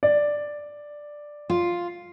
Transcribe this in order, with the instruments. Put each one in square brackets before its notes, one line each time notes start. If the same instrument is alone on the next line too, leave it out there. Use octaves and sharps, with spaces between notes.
[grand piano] D5
[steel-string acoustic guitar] F4